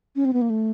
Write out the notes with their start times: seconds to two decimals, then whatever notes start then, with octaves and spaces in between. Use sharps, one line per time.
0.16 C#4
0.25 C4
0.33 B3
0.42 A#3
0.50 A3